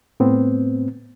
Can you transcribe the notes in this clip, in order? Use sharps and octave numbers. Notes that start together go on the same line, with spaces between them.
A2 B3 C4